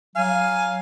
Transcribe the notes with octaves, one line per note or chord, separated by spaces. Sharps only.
F#3 F5 G#5